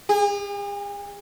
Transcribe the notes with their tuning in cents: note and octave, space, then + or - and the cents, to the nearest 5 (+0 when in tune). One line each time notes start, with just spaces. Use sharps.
G#4 -45